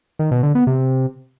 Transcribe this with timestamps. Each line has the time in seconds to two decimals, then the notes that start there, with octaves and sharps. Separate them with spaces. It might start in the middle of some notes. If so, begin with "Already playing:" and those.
0.19 D#3
0.31 B2
0.43 D3
0.55 B3
0.67 C3